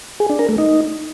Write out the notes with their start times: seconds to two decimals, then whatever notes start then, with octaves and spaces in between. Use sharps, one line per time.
0.20 G#4
0.30 D4
0.39 A#4
0.49 A3
0.58 D#4